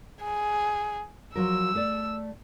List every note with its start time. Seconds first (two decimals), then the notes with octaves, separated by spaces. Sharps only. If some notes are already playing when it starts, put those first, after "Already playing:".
0.22 G#4
1.35 F3 F#3 A#4 E6
1.75 A3 A4 D5